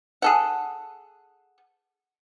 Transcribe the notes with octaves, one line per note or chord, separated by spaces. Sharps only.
G#4 A4 F#5